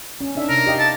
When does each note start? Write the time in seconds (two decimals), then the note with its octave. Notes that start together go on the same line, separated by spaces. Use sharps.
0.21 C#4
0.36 D4 D#4 E5
0.49 C3 A#4
0.66 G4 D#5 F5
0.79 A5